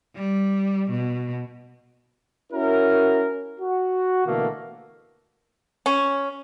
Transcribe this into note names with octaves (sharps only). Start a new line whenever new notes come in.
G3
B2
C#4 E4 F#4 A#4
F#4
B2 D3 E3 A3 A#3
C#4